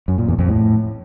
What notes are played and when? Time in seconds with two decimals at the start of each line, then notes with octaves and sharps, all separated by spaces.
0.08 F#2
0.18 A#2
0.28 E2
0.39 F2
0.49 A2